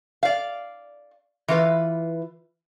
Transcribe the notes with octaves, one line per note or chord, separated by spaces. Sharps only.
D5 F5
E3 F4 B4